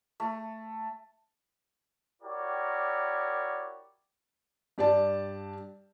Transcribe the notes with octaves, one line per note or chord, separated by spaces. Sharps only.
A3
E4 F#4 G4 A#4 C#5 D5
G2 G4 D5 A5